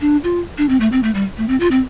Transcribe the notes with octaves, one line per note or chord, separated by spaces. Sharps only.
D4
F4
D4
C4
A3
C4
A3
G3
A3
C4
F4
C4